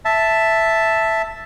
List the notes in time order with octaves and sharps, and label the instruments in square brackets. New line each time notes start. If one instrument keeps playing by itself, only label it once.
[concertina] E5 A5